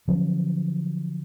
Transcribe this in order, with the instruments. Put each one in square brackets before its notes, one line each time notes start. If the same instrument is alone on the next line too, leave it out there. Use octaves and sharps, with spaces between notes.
[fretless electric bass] D3 F3 F#3 C#4